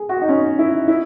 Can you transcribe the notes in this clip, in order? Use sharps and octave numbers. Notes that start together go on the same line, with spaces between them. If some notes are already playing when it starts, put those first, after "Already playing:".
Already playing: G#4
F#4
D#4
C#4
E4
E4